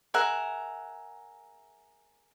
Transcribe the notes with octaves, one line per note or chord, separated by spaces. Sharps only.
G#4 A#4 E5 F#5